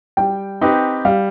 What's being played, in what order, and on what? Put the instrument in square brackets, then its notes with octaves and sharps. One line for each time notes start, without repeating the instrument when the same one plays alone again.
[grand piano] G3 [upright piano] G5
[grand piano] C4 D#4 G4 B4
[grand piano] G3 [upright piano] F5